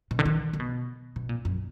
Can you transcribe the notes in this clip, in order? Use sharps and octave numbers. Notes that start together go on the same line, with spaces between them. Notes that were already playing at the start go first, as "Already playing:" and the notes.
B2
D3
D#3
D3
B2
B2
A#2
F#2